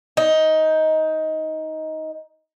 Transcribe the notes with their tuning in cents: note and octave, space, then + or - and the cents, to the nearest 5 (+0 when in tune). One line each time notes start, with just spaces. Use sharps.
D#4 +15